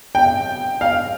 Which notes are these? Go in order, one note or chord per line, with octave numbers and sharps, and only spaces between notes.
G5
F5